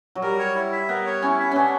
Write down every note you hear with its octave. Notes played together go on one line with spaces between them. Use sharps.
F#3
G3 A#4
C#5
E4
E5
B3 A#4
C#5
C#4 E4
E5
B3 C#4 D4